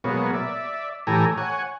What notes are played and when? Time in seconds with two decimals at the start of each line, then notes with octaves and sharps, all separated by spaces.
0.04 B2 F#3 G#3 A#3 B3 C#5
0.33 D5 E5
1.07 A2 E3 G4 A4 G#5 A#5
1.38 C#5 F#5 G#5